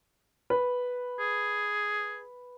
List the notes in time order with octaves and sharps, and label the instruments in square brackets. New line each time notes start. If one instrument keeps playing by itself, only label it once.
[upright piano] B4
[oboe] G#4